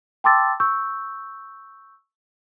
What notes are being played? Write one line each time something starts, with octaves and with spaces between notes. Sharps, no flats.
G5 A5 C6 D6 E6 A6
C#6 E6 G6